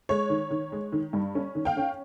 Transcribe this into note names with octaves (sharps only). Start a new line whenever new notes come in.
G#3 C#5
D#3
D#3
G#3
D#3
G2
C#4
D#3
F5 G5
C#4